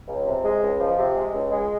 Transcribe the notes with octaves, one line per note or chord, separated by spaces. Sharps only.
C#2
C3
G#3
C#2
F3
C3
G#3
C#2
G#3